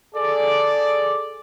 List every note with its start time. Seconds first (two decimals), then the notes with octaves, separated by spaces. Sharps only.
0.15 G#4 A4 D5